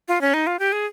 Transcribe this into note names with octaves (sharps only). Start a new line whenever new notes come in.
F4
C#4
D#4
F4
G4
G#4